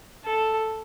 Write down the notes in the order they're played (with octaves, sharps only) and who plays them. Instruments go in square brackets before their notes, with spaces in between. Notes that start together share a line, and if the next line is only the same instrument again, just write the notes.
[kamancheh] A4